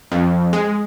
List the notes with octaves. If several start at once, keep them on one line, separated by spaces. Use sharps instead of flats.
F2
G#3